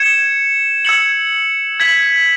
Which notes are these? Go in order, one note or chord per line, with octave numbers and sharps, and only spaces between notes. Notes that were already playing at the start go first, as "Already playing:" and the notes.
Already playing: G#6 C#7 E7
E6 G#6 C#7 F#7
G#6 B6 F#7